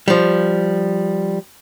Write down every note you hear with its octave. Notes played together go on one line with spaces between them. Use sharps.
F3 G3